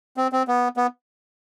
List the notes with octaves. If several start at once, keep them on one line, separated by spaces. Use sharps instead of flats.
C4
C4
B3
B3